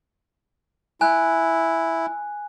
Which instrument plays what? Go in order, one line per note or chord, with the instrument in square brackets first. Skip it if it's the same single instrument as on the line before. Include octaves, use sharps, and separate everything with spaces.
[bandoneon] E4 [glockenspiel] G#5 F#6